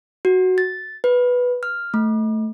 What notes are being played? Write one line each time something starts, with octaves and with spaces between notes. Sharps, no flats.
F#4
A6
B4
F6
A3